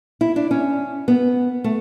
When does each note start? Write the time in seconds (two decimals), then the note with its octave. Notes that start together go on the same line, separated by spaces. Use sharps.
0.21 E4
0.36 D4
0.51 C#4
1.08 B3
1.64 A3